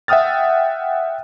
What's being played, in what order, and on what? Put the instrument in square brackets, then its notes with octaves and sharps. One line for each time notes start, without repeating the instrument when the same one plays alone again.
[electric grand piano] E5 F#5 G5 D#6 F6 A6